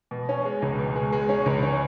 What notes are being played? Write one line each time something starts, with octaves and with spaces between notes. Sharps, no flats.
B2
C#4
G#3
C#2
B2
G#3
G#3
C#4
C#2
C#4